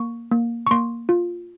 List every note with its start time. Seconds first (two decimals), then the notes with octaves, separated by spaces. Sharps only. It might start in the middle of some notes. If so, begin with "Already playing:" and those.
Already playing: A#3 C#6
0.31 A#3
0.67 C#6
0.71 A#3 C6
1.09 F4